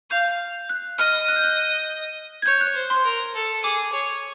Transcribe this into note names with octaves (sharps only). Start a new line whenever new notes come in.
F5 G6
F#6
D#5 F6
F#6
G6
F#6
G#6
C#5 G6
F#6
C5
C6
A#4
A4
G#4 D6
C#5